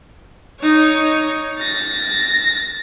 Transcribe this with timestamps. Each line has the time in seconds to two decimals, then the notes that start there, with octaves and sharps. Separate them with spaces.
0.60 D#4 C#5
1.59 A6 A#6